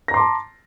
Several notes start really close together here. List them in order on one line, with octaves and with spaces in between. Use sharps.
A#6 A#5 C6 D6 A5